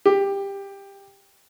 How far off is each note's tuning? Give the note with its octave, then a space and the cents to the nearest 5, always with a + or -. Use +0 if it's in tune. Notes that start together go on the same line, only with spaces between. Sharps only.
G4 +15